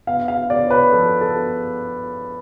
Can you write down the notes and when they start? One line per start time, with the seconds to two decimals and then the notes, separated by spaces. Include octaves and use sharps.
0.07 B3 F5
0.28 F5
0.49 B3 D5
0.67 C#5
0.71 B4
0.92 F3 A4
1.21 A4
1.35 B3